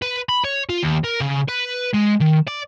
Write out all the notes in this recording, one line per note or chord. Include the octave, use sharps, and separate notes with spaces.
B4
B5
C#5
F4
D#2
A#4
C#3
B4
G#3
D#3
D5